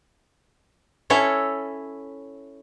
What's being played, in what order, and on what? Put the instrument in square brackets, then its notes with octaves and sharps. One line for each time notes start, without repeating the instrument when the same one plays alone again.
[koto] C#4 E4 A4 C#5